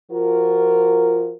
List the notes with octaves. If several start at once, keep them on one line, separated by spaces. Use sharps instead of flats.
F3 F4 F#4 A#4